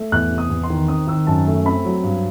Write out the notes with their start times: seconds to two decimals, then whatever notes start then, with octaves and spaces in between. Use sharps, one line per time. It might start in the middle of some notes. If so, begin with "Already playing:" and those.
Already playing: A3
0.12 E2 F#6
0.31 C3
0.38 D#6
0.50 E2
0.64 C6
0.70 D#3
0.88 C4 D#6
1.07 D#3 E6
1.27 F#2 A5
1.47 A3
1.65 C4 B5
1.85 F#3
2.03 G2